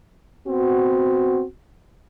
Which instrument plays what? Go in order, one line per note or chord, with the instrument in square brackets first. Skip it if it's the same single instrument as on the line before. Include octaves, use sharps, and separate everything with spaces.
[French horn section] B3 C4 F#4